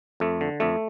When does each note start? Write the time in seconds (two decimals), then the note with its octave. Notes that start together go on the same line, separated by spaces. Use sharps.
0.20 F2 A3
0.41 D3
0.60 F2 A3